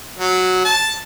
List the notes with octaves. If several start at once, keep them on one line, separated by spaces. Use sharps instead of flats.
F#3
A5